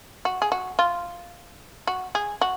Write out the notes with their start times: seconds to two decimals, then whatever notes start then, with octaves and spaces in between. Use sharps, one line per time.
0.25 F#4
0.42 G#4
0.52 F#4
0.79 F4
1.87 F#4
2.15 G#4
2.41 F#4